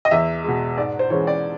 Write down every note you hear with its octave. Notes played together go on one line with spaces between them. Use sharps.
D#5
E2 E5
B2 G#3
G#2 D5
C5
E3 G#3 C#4 C#5
D5